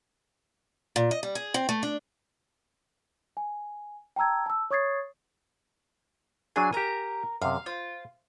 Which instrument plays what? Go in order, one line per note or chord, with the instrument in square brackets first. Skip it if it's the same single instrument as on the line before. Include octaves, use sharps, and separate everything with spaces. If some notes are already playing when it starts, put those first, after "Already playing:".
[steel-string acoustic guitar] A#2
D#5
G3
G#4
C4
A3
D4
[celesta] G#5
G5 A5 A#5 E6 G#6
A5 E6
C#5 C#6 D#6 G#6 A6 C7
[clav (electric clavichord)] F#3 D4 G#4 [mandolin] G#5
[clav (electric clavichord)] G4 G#5 [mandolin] A#4 A#5
[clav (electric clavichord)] F#2 C3 [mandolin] F5
[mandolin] F4 [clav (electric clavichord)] C5